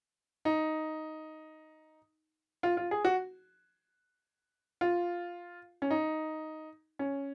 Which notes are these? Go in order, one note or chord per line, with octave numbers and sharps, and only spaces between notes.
D#4
F4
F4
G#4
F#4
F4
C#4
D#4
C#4